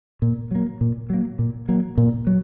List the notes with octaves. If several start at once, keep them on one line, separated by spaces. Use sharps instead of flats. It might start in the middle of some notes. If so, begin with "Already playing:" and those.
A#2
F#3 A#3
A#2
F#3 A#3
A#2
F#3 A#3
A#2
F#3